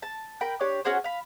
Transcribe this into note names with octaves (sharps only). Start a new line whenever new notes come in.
A5
A#4 G5 B5
D4 G4 C#5
C#4 F#4 G#4 C5
F5 B5